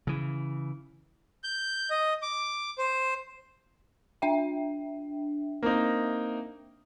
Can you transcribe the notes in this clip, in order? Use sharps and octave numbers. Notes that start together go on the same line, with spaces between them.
C#3 E3
G6
D#5
D6
C5
D4 E5 G5
A#3 C4 D#4